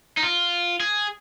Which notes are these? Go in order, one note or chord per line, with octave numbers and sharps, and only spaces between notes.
D#4
F4
G#4